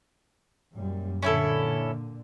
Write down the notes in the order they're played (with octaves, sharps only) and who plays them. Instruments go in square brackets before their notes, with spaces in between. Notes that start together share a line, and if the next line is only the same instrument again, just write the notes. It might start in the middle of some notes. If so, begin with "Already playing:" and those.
[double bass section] F#2 A#2 G3
[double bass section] A#2 D3 [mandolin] C#4 E4 A4